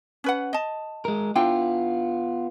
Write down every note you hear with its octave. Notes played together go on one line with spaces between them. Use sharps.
C#4 B4 F#5
D#5 A5
G#3 A#4
B3 D4 E4 F4 G5